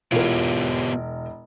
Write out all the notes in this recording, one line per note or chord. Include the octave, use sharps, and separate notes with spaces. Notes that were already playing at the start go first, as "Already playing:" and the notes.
E1 B3 E4 F4 G4 A#4 C#5